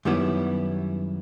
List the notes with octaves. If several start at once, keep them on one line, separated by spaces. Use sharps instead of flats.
F#2 D#3 G3 B3 E4